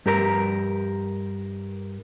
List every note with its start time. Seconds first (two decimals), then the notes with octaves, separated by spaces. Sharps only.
0.06 G2 G4 A#4 B4 A#5